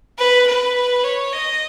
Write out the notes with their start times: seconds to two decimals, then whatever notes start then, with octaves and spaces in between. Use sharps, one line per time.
0.18 B4
0.47 B4
1.04 C#5
1.33 D#5